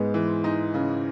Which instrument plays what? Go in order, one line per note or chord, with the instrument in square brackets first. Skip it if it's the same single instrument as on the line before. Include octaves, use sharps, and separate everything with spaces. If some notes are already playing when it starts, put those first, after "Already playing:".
Already playing: [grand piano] G#2 G#3 [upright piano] B3
[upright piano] E3
D#4
C#3